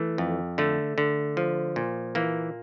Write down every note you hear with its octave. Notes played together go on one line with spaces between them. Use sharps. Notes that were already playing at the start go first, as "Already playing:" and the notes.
Already playing: E3 A3
F2
D3 A3
D3
F3
A#2
E3 A#3